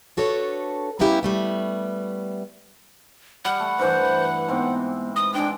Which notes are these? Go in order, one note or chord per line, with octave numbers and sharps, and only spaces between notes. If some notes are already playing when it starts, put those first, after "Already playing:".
D4 F#4 A4 B4 C#5
G3 A#3 B3 C#4 E4 G4
G3 A3 B3
G3 F#5
A3
G2 E3 C5
G#2 B3 C4 G5
D#6
G#3 C4 D4 G5